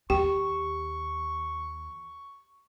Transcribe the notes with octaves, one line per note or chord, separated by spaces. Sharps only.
D#2 G4 G5 C#6